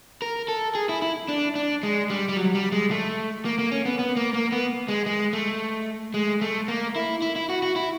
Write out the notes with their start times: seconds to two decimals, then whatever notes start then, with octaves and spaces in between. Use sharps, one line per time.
0.22 A#4
0.48 A4
0.75 G#4
0.89 E4
1.02 E4
1.29 D4
1.55 D4
1.83 G#3
2.10 G3
2.29 G3
2.37 F#3
2.55 G3
2.72 G#3
2.91 A3
3.45 A#3
3.59 A#3
3.72 C#4
3.85 B3
3.99 B3
4.17 A#3
4.34 A#3
4.52 B3
4.88 G#3
5.06 G#3
5.33 A3
6.14 G#3
6.41 A3
6.68 A#3
6.96 E4
7.22 E4
7.36 E4
7.50 F#4
7.63 F#4
7.76 E4